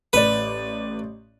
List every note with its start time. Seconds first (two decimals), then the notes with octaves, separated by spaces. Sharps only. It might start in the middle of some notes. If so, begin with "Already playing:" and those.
0.13 A1 B4 D5